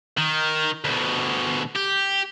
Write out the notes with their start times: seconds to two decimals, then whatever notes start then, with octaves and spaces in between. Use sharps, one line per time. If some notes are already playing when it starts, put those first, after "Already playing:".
0.17 D#3
0.85 D2 B2
1.76 G4